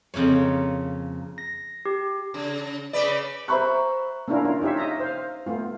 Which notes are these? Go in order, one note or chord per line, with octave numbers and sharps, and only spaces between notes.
F2 C#3 A#3 C#5
A#6
G4
C#3
C#3 B4 D5
C5 E5 A#5 B5 C#6 F#6
A#3 C#4 D4 E4 F4 A#4
F4 A#4
D#4 F4 G4 C#5 E5
D#5 E5 A#5
C5 F5
A3 B3 F4